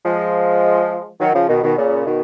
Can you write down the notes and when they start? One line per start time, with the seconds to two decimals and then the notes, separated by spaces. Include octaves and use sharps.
0.05 F3 G#3
1.20 D#3 F#3
1.34 C#3 F3
1.49 B2 D#3
1.63 B2 D#3
1.77 A#2 C#3
2.06 B2 D#3